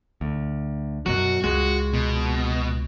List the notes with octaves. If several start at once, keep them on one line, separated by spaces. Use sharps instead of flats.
D2
F#2 B2 F#3 F#4
C#2 G#3 F#4
B2